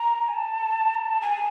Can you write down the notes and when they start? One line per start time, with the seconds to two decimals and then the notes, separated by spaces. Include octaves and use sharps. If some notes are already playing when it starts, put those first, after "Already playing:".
Already playing: A#5
0.28 G#5
0.34 A5
0.95 A#5
1.05 A5
1.22 G#5